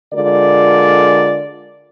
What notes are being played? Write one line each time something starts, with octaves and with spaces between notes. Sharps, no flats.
D3 G#3 F4 A#4 D5